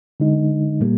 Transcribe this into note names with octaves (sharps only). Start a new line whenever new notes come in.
D3 G#3 D#4
A#2 G3 A#3